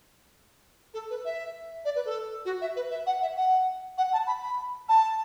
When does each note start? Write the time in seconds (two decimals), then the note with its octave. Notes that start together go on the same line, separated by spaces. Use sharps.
0.93 A4
1.10 B4
1.24 E5
1.84 D5
1.95 B4
2.05 A4
2.45 F#4
2.61 E5
2.75 B4
2.90 E5
3.06 F#5
3.22 E5
3.36 F#5
3.97 F#5
4.12 A5
4.26 B5
4.42 B5
4.88 A5